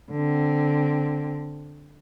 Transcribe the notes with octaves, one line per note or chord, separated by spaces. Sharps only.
D3 C4